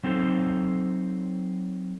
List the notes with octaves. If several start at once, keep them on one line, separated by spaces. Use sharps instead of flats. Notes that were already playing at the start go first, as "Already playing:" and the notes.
F#3 C4 D#4 A4 C5